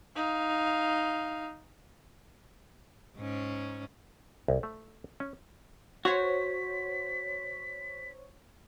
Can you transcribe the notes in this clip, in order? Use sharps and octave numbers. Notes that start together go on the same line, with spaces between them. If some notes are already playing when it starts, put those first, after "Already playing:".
D#4 F5
G#2 C#4
C2
A3
C#4
F#4 C5 C#5 B6